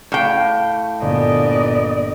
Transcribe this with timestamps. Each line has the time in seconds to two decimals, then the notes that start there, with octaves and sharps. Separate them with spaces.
0.12 A2 F5 G5 D6
1.02 G1 A#2 B3 D5 D#5